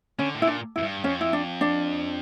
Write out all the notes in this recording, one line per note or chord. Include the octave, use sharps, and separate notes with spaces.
D3 C#4
A2
A#2 E4
D4
F2 E4
G2
F2 C#4
E4
D4
D4